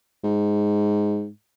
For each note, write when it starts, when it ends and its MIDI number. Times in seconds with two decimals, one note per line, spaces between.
0.24 1.28 44